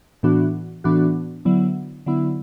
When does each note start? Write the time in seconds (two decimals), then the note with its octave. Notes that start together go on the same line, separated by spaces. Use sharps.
0.23 A2 E3 B3 D4 F#4
0.84 A2 E3 B3 D4 F#4
1.45 D3 F#3 B3 E4
2.06 D3 F#3 B3 E4